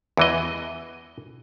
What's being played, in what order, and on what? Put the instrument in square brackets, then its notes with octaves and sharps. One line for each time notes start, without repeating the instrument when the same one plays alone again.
[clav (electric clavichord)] E2 E3 D#5